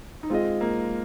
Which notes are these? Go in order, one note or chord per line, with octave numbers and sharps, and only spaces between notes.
D#4
G#3 C4 F4 G#4 D#5
A#3